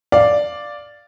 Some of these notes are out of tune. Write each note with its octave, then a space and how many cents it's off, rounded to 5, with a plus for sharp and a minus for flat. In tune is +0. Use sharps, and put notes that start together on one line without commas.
D5 +0 F5 +0